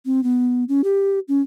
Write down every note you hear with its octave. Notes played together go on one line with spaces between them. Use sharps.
C4
B3
C#4
G4
C#4